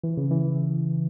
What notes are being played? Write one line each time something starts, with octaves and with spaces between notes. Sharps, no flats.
E3
C#3
E3